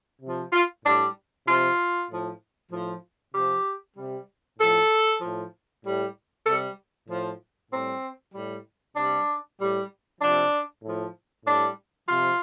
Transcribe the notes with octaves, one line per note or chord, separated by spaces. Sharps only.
C3 F3
F4
A2 G3 D4
C3 F3 F4
A2 F3
A2 F3
C3 F3 G4
C3 G3
A2 F3 A4
A2 F3
A2 G3
C3 G3 A4
A2 F3
A2 G3 C4
A2 G3
C3 G3 D4
A2 G3
C3 F3 D4
A2 F3
A2 G3 D4
C3 F3 F4